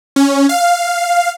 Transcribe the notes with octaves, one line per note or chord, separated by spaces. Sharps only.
C#4
F5